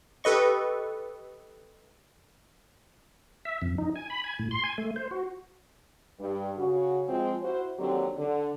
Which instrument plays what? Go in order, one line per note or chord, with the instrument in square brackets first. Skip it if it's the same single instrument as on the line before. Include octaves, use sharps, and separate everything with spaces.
[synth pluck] G4 A4 B4 D#5 C#6
[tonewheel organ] E5
F2
D#4
G#5
B5
G#5
A2
C6
G#5
A3
C5
F#4
[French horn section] G2
C#3 F#4
F3 G#3 C4 F4
E4 F#4 C5
D#2 D3 F#3 C4 G4
D3